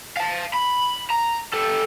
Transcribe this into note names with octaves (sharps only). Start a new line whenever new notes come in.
F5 A5
B5
A#5
G3 A4